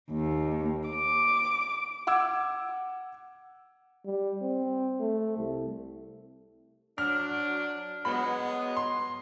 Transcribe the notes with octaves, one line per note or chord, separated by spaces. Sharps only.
D#2
D6
F#5 D6 E6 G#6
G3
C4
A3
C2
F#3 D4 F6
F#3 G#3 B3 B5
C6